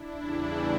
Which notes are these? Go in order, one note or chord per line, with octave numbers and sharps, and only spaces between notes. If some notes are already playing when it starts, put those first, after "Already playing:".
Already playing: D4 E4
E2 C#3 E3 G3